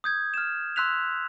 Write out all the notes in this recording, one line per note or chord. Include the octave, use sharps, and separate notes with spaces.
D#6 G6 G#6
F6 E7
C6 E6 F#6 B6 F7